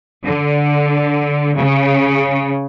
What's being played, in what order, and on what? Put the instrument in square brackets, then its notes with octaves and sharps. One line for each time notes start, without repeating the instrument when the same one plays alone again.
[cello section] D3
C#3